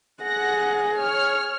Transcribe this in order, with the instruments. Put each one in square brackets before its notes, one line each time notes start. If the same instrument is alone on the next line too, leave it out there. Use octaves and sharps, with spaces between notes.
[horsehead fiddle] G#4 [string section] F#5 F#6 A#6
[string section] C#5 F6